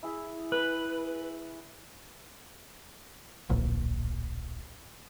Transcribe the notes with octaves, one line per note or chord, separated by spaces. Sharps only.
E4 G#4 E5
B4
D1 A#1